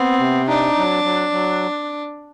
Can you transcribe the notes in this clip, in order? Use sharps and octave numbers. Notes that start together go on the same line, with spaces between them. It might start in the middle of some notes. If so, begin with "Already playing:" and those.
Already playing: B3 C4
C3
D4 D#4
F#3
F#3
F#3